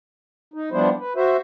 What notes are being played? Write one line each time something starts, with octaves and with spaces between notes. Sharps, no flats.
D#4
F3 G3 B3 D4 E4 C5
B4
F#4 C5 E5